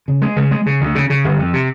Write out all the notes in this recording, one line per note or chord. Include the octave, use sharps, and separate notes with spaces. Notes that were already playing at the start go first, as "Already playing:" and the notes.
C#3
G#3
C#3
G#3
C#3
D2
C#3
C#3
G1
F2
C3